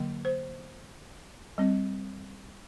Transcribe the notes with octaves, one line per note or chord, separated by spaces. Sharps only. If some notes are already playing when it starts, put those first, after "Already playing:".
Already playing: D3 F#3 A#3
C5
G3 C4